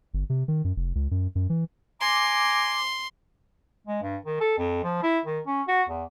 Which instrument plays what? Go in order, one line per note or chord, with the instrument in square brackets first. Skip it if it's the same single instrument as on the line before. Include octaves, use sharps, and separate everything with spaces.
[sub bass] G1
C3
D#3
F#2
F1
C#2
F#2
F#2
E3
[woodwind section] G#5 A#5 D6 [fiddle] C6
[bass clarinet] G#3
G2
D#3
A4
F2
F3
E4
D#3
C#4
F#4
E2